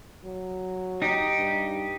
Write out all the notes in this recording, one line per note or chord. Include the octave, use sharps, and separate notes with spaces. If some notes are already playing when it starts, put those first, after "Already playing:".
F#3
D#4 G4
G2